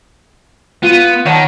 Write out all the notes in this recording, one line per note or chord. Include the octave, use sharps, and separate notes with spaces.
B3 F4
D#3 C#5 F#5 A5